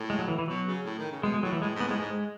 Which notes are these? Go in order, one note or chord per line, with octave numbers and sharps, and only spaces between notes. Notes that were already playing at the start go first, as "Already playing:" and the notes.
Already playing: A2
G#3
F#3
E3
E3
B2 F#3
C#3
A2
D#3
C#3
B2 G#3
G#3
A2 F#3
E3
A2 G#3
G#2
B3
A2 G#3
G#2 G#3